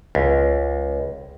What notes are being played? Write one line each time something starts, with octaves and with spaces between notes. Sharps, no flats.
C#2